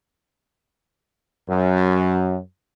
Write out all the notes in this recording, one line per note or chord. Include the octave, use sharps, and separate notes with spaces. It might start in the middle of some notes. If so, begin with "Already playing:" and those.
F#2